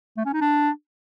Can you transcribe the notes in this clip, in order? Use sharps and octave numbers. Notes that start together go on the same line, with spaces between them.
A3
C#4
D#4
D4